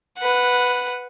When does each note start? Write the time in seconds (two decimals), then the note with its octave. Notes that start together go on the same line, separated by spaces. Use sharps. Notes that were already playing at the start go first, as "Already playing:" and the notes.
0.18 B4 F#5